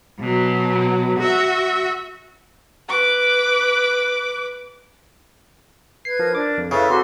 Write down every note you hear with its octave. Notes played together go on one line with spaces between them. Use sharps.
B2 F#3
F#4 E5
B4 D6
B4 G#6 C7
F3 A#4
D4 D6
F2
C#3 E4 A4 B4 C#5 E5 F5 E6
C4 F#4 G4 A4 C6